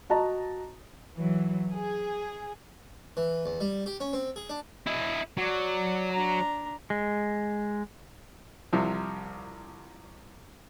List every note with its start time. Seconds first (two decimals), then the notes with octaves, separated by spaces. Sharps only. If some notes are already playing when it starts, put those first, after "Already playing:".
0.10 F#4 D#5 A5 A#5
1.14 E3 F#3
1.73 G#4
3.17 E3
3.46 E2
3.61 G3
3.86 G4
4.00 C#4
4.13 C4
4.36 G#4
4.50 D4
4.87 E4 D#5
5.38 F#3 D5
6.11 D4 A#5
6.90 G#3
8.73 C2 C3 F3